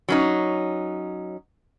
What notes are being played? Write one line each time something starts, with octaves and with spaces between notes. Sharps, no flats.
F#3 C#4 D#4